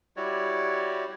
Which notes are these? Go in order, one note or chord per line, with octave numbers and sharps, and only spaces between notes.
G3 E4 F#4 G4 C#5 D5